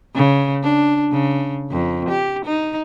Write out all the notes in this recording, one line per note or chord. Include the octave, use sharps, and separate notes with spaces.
C#3
D4
C#3
F2
G4
D#4